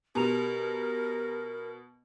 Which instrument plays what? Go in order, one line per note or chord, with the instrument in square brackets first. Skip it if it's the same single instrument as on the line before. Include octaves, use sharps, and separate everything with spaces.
[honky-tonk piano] B2 [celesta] G4 A#5 F7 [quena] A#4